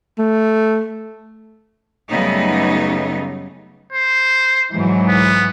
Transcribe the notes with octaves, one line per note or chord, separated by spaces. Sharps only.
A3
F#2 C#3 G3 A3 B3 D#4
C5
G#2 E3 F#3
B3